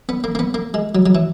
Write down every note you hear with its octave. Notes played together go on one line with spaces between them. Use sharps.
B3
A#3
A#3
B3
A#3
G#3
F#3
F#3
E3